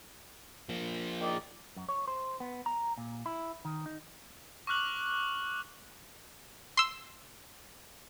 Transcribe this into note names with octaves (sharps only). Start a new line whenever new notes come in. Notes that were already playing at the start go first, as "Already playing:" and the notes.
F3 A#3
D#3 G#4 D5
F#2
C#5
C5
B3
A#5
A#2
E4
D#3
D#4
C#6 D6 F6 F#6 F#7
C6 E6